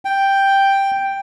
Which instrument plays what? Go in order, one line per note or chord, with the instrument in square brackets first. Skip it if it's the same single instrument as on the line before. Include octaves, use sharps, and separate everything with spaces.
[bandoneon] G5